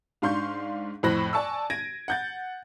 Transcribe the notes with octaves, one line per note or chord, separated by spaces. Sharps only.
G#2 D4 F5 C6 C#6 G6
F2 A2 C5 B5 F#6 A#6
D5 G#5 A5 C#6 E6
G#6 A#6 D7 D#7
F#5 G6 A6